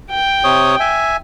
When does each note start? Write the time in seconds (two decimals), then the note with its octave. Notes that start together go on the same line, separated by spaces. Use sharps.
0.11 G5
0.44 C3 C#5 D#6
0.80 E5 G#5